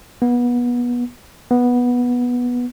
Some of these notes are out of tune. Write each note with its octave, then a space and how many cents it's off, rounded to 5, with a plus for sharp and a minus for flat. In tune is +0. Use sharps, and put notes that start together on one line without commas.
B3 -25
B3 -10